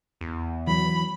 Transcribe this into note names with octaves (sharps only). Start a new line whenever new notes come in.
E2
E3 F#3 B5